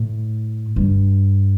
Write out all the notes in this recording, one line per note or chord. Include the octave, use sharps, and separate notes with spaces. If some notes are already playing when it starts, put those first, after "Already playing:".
Already playing: A2
G2